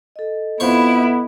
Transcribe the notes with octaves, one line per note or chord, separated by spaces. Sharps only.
A4 D#5
F2 B3 E4 C5 C#6